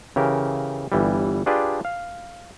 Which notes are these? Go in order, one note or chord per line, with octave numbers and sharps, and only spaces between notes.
C#3 E3 G4 A#4
G1 E3 G3
D4 F4 G4 G#4 B4 D5
F5